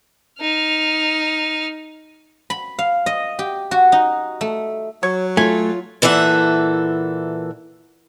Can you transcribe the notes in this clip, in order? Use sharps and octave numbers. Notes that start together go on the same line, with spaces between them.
D#4 F6
B5
F5
D#5
G4
F#4
D#4
A3
F#3 C#5
A3 F4 C#5 G#5
A#2 E3 A4 E5 F#5